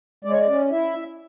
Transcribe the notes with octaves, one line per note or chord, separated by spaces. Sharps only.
G#3 D5
C#5
D5
C#4
E4 E5